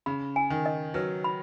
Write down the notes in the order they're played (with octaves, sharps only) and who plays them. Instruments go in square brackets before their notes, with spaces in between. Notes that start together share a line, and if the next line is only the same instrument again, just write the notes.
[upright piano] C#3 [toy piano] B5
[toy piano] G#5
[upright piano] D#3
[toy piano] D#5
[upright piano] F#3 [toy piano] B4
[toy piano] B5